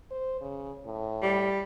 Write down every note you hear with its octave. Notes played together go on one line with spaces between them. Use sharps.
C5
C#3
A2
G3